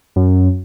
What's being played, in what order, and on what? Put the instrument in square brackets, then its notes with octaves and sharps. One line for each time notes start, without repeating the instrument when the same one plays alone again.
[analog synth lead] F#2